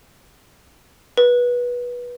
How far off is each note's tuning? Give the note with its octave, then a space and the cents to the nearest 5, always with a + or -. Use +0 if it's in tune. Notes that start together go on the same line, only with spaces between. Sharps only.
B4 -20